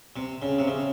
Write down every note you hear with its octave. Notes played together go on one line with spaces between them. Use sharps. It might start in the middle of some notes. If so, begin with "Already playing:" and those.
C3
C#3
C3
C#3